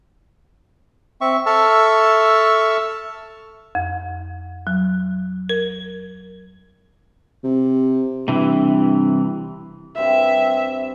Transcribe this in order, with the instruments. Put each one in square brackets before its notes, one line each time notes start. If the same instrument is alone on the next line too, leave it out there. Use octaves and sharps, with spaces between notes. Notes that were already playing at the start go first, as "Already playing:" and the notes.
[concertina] C4 E5 C#6
A4 E5 A5 C#6 E6 F6
[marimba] F2
F#3
A#4
[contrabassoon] C3
[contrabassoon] G2 [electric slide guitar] C3 E3
[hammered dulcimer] G2 C4 F4 [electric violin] E5